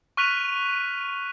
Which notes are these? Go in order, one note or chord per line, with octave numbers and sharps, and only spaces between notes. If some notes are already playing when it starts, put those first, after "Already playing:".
C#6 F6 F#6 B6 D#7 F7